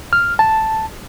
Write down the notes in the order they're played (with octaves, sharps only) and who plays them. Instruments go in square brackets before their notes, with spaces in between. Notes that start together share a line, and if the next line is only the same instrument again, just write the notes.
[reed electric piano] F6
A5